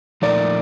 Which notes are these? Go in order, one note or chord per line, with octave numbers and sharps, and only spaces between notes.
A#2 F3 A3 D#4 A#4 D5